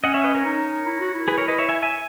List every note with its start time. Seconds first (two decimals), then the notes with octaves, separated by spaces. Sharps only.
0.03 C#4 D#5 F#5
0.14 C#5 E5
0.24 B4 D#5
0.35 A#4 C#5
0.45 D#4
0.86 E4
1.00 F#4
1.14 E4
1.28 G#4 B4
1.38 A#4 C#5
1.48 B4 D#5
1.58 C#5 E5
1.69 E5 G#5
1.83 E5 G#5